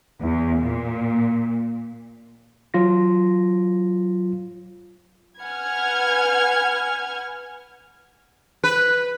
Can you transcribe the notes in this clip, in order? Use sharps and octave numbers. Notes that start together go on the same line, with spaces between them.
E2
A#2
F#3 F4 A#6
B4 F#5 G#5 F6 G#6
B4